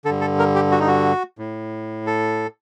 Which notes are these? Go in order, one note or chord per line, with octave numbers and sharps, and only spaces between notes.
G2 D3 A4
A4
A#4
G4
F#4
D#4
F#4
A2
A4